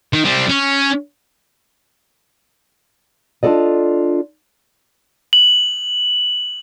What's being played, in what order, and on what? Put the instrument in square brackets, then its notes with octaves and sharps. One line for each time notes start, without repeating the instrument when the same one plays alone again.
[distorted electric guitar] D#3
G3 C4
C#4
[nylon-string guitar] D4 F4 F#4 A4 D5 D#5
[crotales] F#7